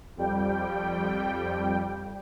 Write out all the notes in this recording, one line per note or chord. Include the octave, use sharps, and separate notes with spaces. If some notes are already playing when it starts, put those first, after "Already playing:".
F2 G3 G5